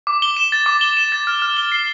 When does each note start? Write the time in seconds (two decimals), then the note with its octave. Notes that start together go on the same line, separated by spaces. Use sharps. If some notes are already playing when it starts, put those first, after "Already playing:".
0.07 D6
0.22 G7
0.37 E7
0.52 A6
0.66 D6
0.81 G7
0.97 E7
1.12 A6
1.27 F6
1.42 F6
1.57 G7
1.72 C7